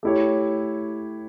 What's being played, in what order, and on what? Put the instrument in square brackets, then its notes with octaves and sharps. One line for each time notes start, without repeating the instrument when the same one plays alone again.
[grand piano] A3 E4 G4 C#5